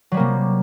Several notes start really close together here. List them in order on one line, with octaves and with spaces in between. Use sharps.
F#3 G3 A#3 C3